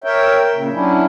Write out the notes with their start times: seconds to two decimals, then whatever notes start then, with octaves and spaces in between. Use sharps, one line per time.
0.04 A#4 C#5 E5 G5
0.53 A#2 C#3
0.73 F#3 C#4 D4 E4